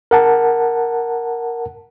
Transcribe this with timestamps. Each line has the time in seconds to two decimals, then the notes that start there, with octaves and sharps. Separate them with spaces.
0.11 A#4 F#5 A5